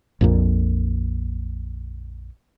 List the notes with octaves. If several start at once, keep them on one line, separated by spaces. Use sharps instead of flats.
A#1 F2 A#2